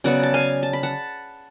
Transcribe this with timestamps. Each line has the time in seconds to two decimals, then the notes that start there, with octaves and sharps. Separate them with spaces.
0.04 C#3 F#3 B3 D5 F#5
0.23 A5
0.34 F5 G#5
0.63 A5
0.73 B5
0.83 F#5 A5